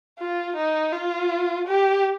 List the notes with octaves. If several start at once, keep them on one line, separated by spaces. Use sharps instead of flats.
F4
D#4
F4
G4